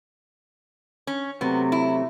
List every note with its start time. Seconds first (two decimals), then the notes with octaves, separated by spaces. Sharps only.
1.07 C#4
1.41 C3 F#3 A3 B3
1.72 E4